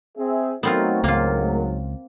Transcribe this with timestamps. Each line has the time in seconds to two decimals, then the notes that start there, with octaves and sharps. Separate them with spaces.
0.18 C4 G#4 E5
0.63 F#3 A3 B3 C4 D#4 F4 F#4 A#4
1.04 C#2 G#2 F#3 A#3 F4